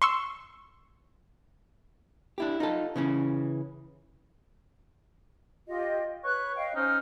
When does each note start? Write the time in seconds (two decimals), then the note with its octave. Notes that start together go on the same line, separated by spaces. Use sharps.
0.02 C6 C#6 E6
2.38 D4 E4 G4
2.60 D#4 F4 A4
2.96 C#3 E3 C#4
5.67 F4 G4 D#5
6.24 B4 C#5 F#6
6.56 D#5 F5 G5
6.75 C#4 D#4 C5 F6